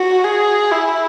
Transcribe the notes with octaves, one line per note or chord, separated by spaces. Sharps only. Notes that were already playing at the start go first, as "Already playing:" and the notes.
Already playing: F#4
G#4
E4